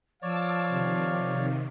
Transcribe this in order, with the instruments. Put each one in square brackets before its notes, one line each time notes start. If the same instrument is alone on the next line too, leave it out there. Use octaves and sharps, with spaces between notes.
[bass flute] F3 [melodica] C#5 D5 [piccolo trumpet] F5 [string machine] A5 D6 E6
[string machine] C3 D#3